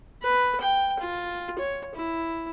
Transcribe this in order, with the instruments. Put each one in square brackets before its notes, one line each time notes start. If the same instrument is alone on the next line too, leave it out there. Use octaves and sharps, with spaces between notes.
[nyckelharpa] B4
G5
F4
C#5
E4